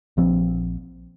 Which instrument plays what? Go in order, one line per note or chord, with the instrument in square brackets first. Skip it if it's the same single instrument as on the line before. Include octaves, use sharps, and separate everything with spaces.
[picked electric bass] A#1 F3 C4